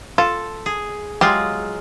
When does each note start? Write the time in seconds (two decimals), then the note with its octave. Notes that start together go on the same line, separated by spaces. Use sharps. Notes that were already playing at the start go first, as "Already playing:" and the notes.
0.18 F4 A4
0.66 G#4
1.21 F#3 G#3 F4 G4